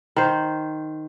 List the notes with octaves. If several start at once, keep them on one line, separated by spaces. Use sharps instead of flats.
D#3 C5